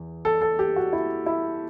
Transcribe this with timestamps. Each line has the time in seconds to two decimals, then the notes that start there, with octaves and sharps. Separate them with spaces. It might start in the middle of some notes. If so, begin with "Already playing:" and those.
Already playing: E2
0.25 A4
0.42 A4
0.59 G4
0.76 F#4
0.93 E4
1.26 E4